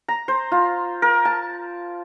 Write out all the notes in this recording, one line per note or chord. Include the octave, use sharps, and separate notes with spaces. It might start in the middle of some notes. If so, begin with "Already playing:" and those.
A#5
C5
F4
A#4
A5